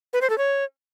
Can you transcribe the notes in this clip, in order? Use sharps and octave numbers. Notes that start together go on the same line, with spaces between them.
B4
C5
A4
C#5